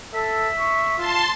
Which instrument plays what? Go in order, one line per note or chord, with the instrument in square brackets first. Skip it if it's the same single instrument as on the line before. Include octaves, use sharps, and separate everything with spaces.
[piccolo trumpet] A4 [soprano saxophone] E5
[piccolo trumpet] C#6
[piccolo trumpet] F4 [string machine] A5 C6